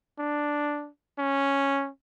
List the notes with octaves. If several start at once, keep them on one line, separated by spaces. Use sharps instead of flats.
D4
C#4